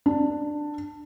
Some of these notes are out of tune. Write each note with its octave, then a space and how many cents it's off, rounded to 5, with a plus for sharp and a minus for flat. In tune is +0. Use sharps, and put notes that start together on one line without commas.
D4 +10